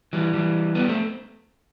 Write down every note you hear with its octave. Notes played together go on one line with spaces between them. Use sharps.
E3 G3
E3 G3
G3 B3
A3 C4